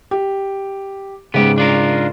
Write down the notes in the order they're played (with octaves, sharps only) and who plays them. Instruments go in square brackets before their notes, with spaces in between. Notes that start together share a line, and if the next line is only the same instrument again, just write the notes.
[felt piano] G4
[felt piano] G#2 C#3 [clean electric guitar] B3 G4
[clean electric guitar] D4 F4 A#4